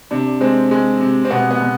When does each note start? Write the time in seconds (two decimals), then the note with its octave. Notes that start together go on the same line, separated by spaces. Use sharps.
0.11 C3 D4
0.41 G#3 C4
0.71 G#3
1.00 C3
1.25 C4
1.31 B2 B3
1.51 B3
1.61 B2